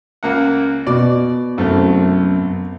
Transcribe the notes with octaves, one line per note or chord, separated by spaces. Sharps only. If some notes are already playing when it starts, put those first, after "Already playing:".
C#2 A#3 F#5
B2 D5
C2 F#2 A3 C4